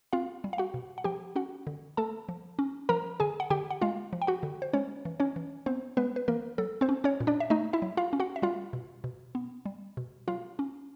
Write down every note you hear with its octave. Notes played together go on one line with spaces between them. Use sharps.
C4 F4 F5
G3
F5
F#4 F#5
B2
F#5
F3 G4 G5
C#4 F#4 F#5
D3
A3 A4 A5
F3
C#4
F3 A#4 A#5
D3 G#4 G#5
F#5
D3 G4 G5
F#5
G#3 F4 F5
F3
G5
F#4 F#5
D3
C5
G#3 C#4 C#5
E3
C#4 C#5
E3
B3 C4 C5
G#3 B3 B4
B4
E3 A#3 A#4
F#3 A4
C4 C5
C#4
C#4 C#5
A#2
D4 D5
E5
A3 D#4 D#5
E4 E5
F#3
F4 F5
C#4
F#4 F#5
E5
G3 F4 F5
B2
B2
B3
G3
B2
F#3 F4 F5
C#4